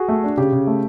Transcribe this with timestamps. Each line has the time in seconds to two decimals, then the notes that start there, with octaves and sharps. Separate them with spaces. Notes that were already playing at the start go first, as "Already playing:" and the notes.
Already playing: F#4 G#4
0.08 A3
0.24 D4
0.37 C#3 G4
0.52 C#3
0.67 A3